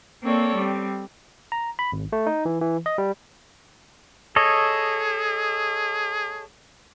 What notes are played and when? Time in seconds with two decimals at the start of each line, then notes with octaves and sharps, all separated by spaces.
0.22 A#3 C4 A4 C#5 D5
0.55 G3 C4
1.52 A#5
1.79 B5
1.92 G#1
2.13 A3
2.27 D#4
2.45 E3
2.61 E3
2.86 D#5
2.98 G3
4.36 G#4 A4 C#5 D#5